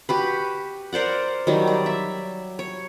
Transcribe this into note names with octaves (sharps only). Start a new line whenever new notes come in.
F#4 G4 B4
A#4 C5 D5 F#5
D#3 F#3 G3
D5
E5
C#5